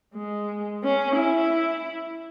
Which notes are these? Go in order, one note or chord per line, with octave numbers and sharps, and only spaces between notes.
G#3
C#4
E4